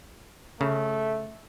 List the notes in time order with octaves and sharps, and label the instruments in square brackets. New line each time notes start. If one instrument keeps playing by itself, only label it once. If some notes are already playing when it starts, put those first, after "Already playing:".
[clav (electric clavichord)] C#3 [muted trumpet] A3